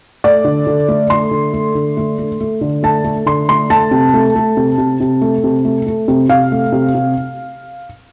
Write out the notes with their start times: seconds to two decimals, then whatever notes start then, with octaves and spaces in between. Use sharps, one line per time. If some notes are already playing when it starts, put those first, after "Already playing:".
0.24 A3 D5
0.45 D3
0.67 D3
0.88 A3
1.10 A3 C6
1.31 D3
1.53 A3
1.75 D3
1.97 A3
2.19 A3
2.41 A3
2.61 D3
2.83 A3 A5
3.04 A3
3.26 D3 C6
3.49 A3 C6
3.70 A3 A5
3.91 C3
4.14 A3
4.35 A3
4.57 C3
4.78 C3
5.00 C3
5.21 A3
5.44 C3
5.65 A3
5.87 A3
6.08 C3
6.29 C3 F5
6.52 A3
6.72 C3
6.95 C3